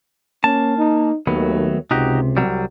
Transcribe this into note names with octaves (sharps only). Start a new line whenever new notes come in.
A#3 C#4 A5
D#4
D#2 D#3 F#3 A3 B3
C#2 C3 D#4 F#4 G4
C2 F#3 G3